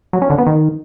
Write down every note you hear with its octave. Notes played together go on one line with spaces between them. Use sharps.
F#3
C#4
D3
B3
D#3